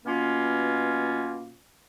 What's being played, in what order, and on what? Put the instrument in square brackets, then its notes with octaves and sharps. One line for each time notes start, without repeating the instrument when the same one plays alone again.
[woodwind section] B2 A#3 C#4 F4